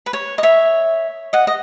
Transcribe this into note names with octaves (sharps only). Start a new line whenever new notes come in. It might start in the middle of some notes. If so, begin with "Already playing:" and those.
B4
C#5
D#5
C#5 E5
D#5 F#5
D#5